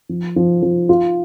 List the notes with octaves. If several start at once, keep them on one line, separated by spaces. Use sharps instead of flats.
F3
F3
F3
F4